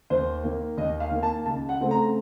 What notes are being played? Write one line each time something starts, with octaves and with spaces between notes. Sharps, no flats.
D#2 C5
D#3 A#3
D#2 D#5
F5
D#3 A#3
A5
C#2 A5
F#5
C#3 A3 C4
A#5